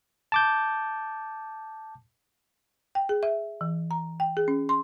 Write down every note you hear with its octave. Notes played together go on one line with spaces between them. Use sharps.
A5 D6 G6
G5
G#4
E5
E3
A#5
G5
G#4
C#4
C6